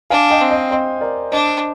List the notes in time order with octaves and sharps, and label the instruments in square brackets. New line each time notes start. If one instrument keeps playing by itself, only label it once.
[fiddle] D4 [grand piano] F5 G#5
[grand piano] D#5 G5
[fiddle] C4
[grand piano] D#5 G5
C5 D#5
A#4 D5
[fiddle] D4 [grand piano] C5 D#5